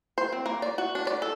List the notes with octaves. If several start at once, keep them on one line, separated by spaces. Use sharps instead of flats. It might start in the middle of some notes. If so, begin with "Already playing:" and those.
C5
C4
A#3
D5
F#4
D4
D5
A4